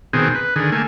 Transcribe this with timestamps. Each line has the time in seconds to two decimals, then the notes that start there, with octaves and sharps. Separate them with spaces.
0.13 B2 D#3 C4 G#4
0.35 B4
0.56 D3 D#3 G#4
0.72 A3 A#3 G#5